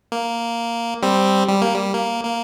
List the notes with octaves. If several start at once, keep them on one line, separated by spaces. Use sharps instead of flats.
A#3
G3 C4
G3
A#3
G3
A#3
A#3